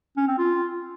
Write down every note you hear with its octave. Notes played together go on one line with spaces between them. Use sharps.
C#4
C4
F4